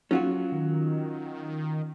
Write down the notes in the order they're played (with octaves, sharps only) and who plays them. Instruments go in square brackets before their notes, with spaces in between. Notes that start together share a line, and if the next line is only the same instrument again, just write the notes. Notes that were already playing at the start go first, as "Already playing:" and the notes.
[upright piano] F#3 F#5 [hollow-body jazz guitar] C#4 F4 F#4
[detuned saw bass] D#3